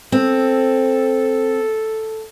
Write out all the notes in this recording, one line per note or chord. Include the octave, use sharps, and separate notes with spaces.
C4 A4